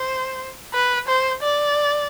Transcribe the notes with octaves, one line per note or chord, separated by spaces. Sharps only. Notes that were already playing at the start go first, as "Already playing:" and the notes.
Already playing: C5
B4
C5
D5